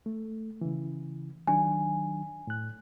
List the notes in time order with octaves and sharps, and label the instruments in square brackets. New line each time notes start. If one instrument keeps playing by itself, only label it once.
[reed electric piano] A3
C#3 E3
[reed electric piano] D#3 F#3 D4 [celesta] G#5
[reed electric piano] A2 F#6